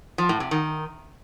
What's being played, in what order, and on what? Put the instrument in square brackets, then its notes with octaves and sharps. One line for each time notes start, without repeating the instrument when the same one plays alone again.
[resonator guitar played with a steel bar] F3
A2
C3
D#3